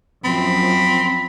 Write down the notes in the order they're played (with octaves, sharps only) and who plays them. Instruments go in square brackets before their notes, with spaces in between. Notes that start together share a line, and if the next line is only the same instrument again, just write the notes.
[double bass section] F#2 F3 [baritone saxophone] C4 [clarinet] B5